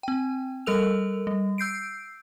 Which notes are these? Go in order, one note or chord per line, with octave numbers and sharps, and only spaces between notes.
C4 G5
G3 A4 A#4 E6 F7
G3
E6 G6 C7 D7